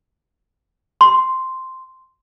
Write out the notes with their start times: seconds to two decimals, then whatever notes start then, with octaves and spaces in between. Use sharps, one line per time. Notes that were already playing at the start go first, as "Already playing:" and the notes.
1.01 C6